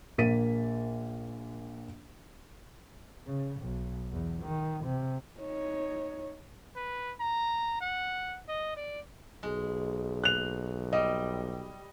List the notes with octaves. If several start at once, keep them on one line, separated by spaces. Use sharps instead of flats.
A#1 A#3 A6 B6 D#7
C#3
B1
E2
D#3
C3
D#4 C#5
B4
A#5
F#5
D#5
D5
B1 G#3
F#6 F7
G3 D#5